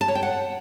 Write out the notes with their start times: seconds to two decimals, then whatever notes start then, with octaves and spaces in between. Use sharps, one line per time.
0.01 A5
0.08 C#5
0.15 G5
0.23 F#5